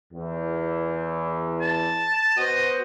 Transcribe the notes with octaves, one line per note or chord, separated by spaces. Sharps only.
E2
A5
B3 F#4 C5 D#5